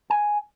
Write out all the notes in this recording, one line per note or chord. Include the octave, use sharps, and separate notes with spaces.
G#5